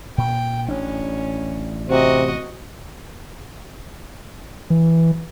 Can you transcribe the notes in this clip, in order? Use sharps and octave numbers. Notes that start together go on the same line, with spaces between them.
A#2 G5
A1 C#4 D4
C3 F#4 D#5
E3